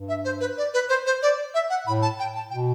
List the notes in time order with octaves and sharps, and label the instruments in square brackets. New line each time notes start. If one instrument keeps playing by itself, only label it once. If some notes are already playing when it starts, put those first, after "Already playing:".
Already playing: [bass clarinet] G2
[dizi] E5
C5
B4
D5
B4
C5
C5
D5
E5
F#5
[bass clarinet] A2 [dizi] B5
[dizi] A5
G5
A5
[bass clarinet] B2 [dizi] G5